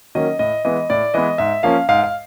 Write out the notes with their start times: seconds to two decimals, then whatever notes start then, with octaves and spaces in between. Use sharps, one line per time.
0.15 D#3 F#3 A#3 C#4 D#5
0.39 A2 D#5
0.65 E3 G#3 B3 D#5
0.90 A2 D5
1.14 E3 G#3 B3 D#5
1.38 G#2 E5
1.63 F3 A#3 C#4 F5
1.89 G#2 F5
2.04 F5